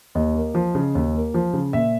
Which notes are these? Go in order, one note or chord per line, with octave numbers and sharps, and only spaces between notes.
D#2 D#5
A#3
F3
C#3
D#2
A#3
F3
C#3
A#2 E5